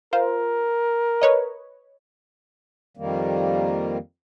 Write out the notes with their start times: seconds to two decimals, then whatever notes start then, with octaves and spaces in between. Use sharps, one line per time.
0.13 F4 A#4 C5
1.22 B4 C#5 D#5
2.97 F2 D#3 G3 A#3